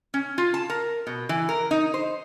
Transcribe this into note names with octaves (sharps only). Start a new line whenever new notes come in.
C#4
F4
A5
A#4
B2
E3
A#4
D#4
C5